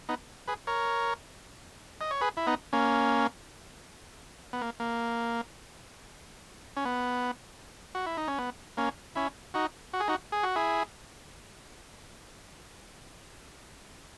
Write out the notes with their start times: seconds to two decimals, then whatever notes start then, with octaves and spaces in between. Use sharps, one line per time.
0.09 B3 D#4
0.48 G#4 B4
0.67 A#4 C#5
2.01 D#5
2.11 C#5
2.21 G#4 B4
2.37 E4
2.47 B3 D#4
2.73 A#3 C#4
4.53 B3
4.61 A#3
4.80 A#3
6.77 C#4
6.85 B3
7.95 F#4
8.06 E4
8.17 D#4
8.28 C#4
8.38 B3
8.77 A#3 C#4
9.15 C#4 E4
9.54 D#4 F#4
9.93 F#4
10.00 G#4
10.08 D#4 F#4
10.32 G#4
10.43 F#4
10.56 E4 G#4